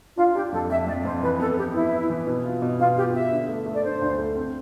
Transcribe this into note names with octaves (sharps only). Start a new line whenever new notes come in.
D4 F4
D4 G4
F2 A4
F2 E5
F2 D5
F2 C5
E3 B4
B3 A4
B3 G4
B3 E4
B3
E3
B2
F4
B2
B2 F4
F4 G4
B3 E5
D3
A3
A3
D5
D3 C5
D2
A3
C4